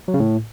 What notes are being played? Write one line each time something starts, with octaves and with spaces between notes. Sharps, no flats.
F#3
C#3
A2